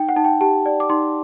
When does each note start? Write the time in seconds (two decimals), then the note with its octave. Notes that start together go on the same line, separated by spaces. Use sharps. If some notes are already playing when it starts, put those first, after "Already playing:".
Already playing: D#4 G5
0.09 F#5
0.16 D#4 A5
0.25 G5
0.41 G4 A5
0.66 D5
0.80 D6
0.90 D#4 C6